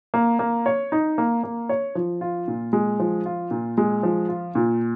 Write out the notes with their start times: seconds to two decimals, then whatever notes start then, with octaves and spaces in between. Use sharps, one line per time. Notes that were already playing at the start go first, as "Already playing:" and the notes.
0.14 A#3
0.39 A#3
0.66 C#5
0.92 D#4
1.18 A#3
1.43 A#3
1.69 C#5
1.95 F3
2.21 F4
2.48 A#2
2.73 G#3
3.00 F3
3.26 F4
3.51 A#2
3.78 G#3
4.03 F3
4.28 F4
4.55 A#2